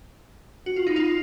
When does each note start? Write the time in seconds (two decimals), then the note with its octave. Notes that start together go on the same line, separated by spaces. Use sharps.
0.66 F#4
0.76 F4
0.87 D#4
0.96 F4